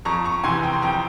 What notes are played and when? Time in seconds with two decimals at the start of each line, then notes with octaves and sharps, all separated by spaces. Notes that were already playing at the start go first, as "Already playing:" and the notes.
0.05 F2 A#5 C#6
0.24 A#5 C#6
0.44 C3 E3 G#5 C6
0.63 G5 A#5
0.73 C6
0.82 F2 G5 A#5